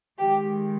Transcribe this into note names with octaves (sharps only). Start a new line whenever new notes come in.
D#3 G#3 G4